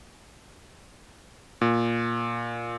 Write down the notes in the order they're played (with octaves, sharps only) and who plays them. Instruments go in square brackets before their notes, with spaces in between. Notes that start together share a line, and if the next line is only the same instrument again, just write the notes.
[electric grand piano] A#2